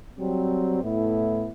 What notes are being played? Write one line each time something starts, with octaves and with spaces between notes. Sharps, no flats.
F#3 G3 C4
A2 A3 B3 E4